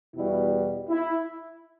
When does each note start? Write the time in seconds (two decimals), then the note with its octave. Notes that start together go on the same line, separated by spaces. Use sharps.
0.14 E2 B2 G3 E4
0.90 E4